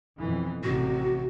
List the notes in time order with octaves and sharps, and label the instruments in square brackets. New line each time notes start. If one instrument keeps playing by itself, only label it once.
[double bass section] F2 B2 E3
[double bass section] A1 C3 [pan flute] F#4